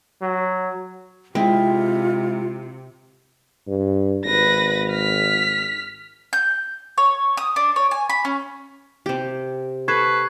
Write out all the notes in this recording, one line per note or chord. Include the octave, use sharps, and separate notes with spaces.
F#3
C3 G#3 C4 E4 F4
G2
G#1 B4 A#6
F6 B6
G6
C#5
D#6
D4
C#5
G#5
B5
C#4
C3 G4
A4 B4 C#6 G#6 C7